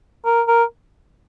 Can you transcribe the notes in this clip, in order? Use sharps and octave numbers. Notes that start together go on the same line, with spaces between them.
A#4
A#4